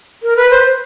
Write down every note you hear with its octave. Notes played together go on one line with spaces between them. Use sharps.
A#4
B4
C5